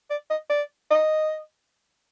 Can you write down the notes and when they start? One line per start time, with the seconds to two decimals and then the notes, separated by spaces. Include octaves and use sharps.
0.10 D5
0.30 D#5
0.49 D5
0.91 D#5